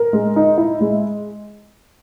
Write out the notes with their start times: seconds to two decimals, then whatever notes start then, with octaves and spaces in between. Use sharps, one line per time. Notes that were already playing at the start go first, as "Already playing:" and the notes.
Already playing: A#4
0.13 G#3
0.36 D#4
0.58 E4
0.80 G#3